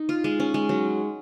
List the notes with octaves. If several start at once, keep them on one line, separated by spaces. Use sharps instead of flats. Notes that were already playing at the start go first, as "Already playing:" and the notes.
Already playing: D#4
F4
G#3
C#4
G#3
F#3